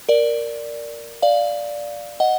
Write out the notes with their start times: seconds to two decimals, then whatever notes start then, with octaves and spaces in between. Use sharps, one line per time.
0.09 A#4 D5
1.22 D5 F5
2.20 D#5 F#5